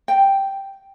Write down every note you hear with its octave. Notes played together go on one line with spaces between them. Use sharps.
G5